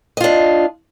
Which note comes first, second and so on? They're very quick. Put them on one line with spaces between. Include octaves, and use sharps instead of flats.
D#5 F4 D4